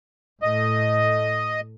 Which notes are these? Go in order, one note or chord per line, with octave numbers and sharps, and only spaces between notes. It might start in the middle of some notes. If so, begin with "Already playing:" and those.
A2 A3 D#5